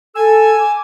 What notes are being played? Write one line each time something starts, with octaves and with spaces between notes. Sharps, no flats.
A4 G#5 E6
D6